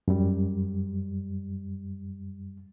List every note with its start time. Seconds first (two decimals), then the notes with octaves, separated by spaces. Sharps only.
0.08 F#2 G3